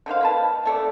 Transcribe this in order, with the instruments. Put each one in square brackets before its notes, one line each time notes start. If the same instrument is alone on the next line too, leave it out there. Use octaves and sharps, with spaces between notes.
[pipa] D3 D#4 C5 F5
A#3 B4 A5
A3 A4 D5